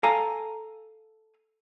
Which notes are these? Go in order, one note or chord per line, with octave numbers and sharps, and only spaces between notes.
A4 F5 G#5 A#5